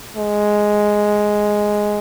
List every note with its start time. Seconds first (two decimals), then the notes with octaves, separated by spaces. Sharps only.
0.17 G#3